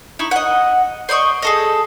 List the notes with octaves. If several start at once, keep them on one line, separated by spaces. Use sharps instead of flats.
D#4 E4 C#6
D#5 F#5
C5 D5 D#5 C#6
G#4 A4 D#5